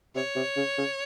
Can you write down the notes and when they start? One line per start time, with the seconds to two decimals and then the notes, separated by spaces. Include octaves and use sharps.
0.15 C3 C#5
0.36 C3
0.57 C#3
0.78 C#3